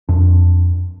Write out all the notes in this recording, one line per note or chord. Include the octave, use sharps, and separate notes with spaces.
F2 D4